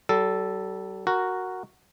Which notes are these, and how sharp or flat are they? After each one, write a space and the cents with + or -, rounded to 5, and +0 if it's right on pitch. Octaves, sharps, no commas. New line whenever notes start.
G3 -45 A4 +0
F#4 +0 A#4 -5